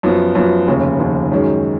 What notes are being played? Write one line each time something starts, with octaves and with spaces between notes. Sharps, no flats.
F#2 F3 B3
F#2 F3 B3
F1 D#2 C#3
F1 D#2 C#3
F#2 D#3 G#3 C#4